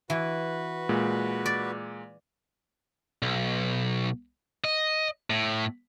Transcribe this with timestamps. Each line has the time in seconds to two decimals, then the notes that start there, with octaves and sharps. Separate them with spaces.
0.10 E3 F#4 B4
0.89 A#2 G#3
1.46 D5
3.22 B1
4.64 D#5
5.30 A2